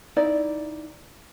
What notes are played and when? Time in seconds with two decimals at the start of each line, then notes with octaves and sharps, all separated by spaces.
0.16 D#4 E4 D5